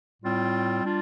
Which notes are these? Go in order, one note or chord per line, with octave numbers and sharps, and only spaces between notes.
A2 G3 C4 F4
G3 D4 F4